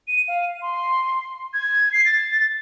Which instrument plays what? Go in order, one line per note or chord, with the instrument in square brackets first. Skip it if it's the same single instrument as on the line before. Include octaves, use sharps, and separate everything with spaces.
[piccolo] D#7
F5
C6
G#6
C7
A6